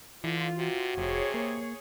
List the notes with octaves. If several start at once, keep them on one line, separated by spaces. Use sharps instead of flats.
D3 E3 F4
C3 F#4
F1 C3 G#4 C#5
A#3